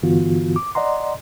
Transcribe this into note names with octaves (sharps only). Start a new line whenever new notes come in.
G2 D3 E3 B3 F4 F#4
D6
D5 D#5 F#5 A#5 C6